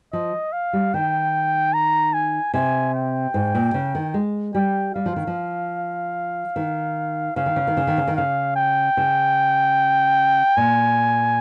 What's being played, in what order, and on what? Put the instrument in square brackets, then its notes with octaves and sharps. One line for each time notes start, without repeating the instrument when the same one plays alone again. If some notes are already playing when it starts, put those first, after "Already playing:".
[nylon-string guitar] F3 [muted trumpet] D#5
[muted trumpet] F5
[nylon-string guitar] G3
[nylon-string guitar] D#3 [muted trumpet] G5
[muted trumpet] A#5
G#5
[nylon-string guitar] C3 [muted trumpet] G#5
[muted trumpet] G5
[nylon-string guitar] G#2
A#2
C#3
D#3
G#3
[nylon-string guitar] G3 [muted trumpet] G5
[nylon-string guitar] G3 [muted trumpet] F5
[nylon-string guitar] F3
D#3
F3
D#3
[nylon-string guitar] C#3 [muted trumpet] F5
[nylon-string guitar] D#3
C#3
D#3
C#3
D#3
C#3
D#3
[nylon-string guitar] C#3 [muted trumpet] F5
[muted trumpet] G5
[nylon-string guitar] C#3
[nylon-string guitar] A#2 [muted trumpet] G#5